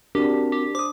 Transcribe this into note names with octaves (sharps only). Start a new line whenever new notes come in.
C4 D4 F#4 G4 A#4
G4
C5 D6 D#6